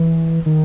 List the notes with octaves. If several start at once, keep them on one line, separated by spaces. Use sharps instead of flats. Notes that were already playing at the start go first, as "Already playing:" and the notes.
Already playing: E3
D#3